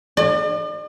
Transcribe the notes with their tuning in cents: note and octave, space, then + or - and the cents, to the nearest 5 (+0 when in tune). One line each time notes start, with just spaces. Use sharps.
D5 +45